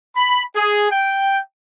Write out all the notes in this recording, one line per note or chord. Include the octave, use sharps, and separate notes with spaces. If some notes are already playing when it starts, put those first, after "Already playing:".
B5
G#4
G5